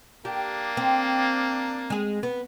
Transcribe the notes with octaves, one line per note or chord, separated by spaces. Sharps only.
A#3 D4 G4
C4
G#3 G#4
B3